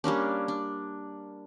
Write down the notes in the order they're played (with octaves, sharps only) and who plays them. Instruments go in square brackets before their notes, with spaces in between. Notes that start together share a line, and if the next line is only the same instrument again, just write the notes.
[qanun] G3 A#3 C#4 D4
D4